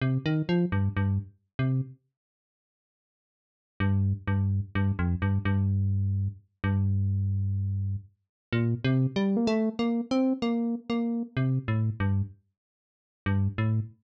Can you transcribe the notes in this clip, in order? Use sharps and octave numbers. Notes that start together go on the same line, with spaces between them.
C3
D#3
F3
G2
G2
C3
G2
G2
G2
F2
G2
G2
G2
A#2
C3
G3
A#3
A3
A#3
C4
A#3
A#3
C3
A2
G2
G2
A2